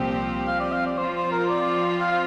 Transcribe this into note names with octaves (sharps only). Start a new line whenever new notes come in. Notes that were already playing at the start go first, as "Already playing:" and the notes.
Already playing: C2 A#2 F3 C4 G4
F5
D5
F5
D5
F3 C4 F4 C5
C5
A#4
D5
F5
F5